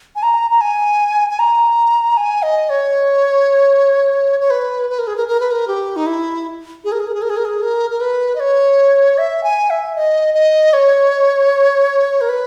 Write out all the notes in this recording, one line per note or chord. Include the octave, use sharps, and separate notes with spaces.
G#5
A#5
A#5
G#5
G#5
A#5
G#5
D#5
C#5
C#5
B4
B4
A#4
G#4
A#4
A#4
B4
A#4
G4
D#4
E4
G#4
A#4
G#4
A#4
G#4
A#4
G#4
A#4
G#4
A#4
A#4
B4
D#5
C#5
E5
G#5
E5
D#5
D#5
C#5
A#4
B4